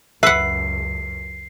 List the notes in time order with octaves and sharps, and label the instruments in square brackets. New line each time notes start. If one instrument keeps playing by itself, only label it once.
[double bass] C#2 F#2 [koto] B4 F#5 [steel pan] E5 [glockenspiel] C7